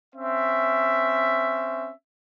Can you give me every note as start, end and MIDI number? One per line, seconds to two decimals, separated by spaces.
0.15 1.90 60
0.15 1.90 61
0.15 1.90 76